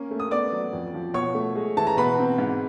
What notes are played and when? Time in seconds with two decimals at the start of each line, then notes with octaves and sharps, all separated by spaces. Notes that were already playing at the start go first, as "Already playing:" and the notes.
Already playing: A#3 C#4 A#4
0.11 A3
0.20 D#6
0.31 B3 D5 D6
0.52 F#3
0.73 F2
0.94 F3
1.14 B2 C#5 C#6
1.35 A3
1.56 G#3
1.77 E3 A5
1.87 A#5
1.97 B2 B4 B5
2.19 C4
2.38 G#2